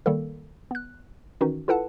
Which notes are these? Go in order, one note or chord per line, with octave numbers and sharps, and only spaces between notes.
D#3 G3 A#3 A4
B3 F#6
D#3 E3 C#4 D#4 F#4
E4 F4 A4 B4 F#5 A5